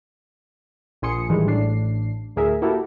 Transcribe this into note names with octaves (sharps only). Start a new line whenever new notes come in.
A#1 F3 G#5 C6 D#6 C#7
A2 D#3 E3 G3 G#3
A1 A2 D4 C7
D2 A2 G#4 A#4 E5
A#3 E4 F#4 G4 A4 A#4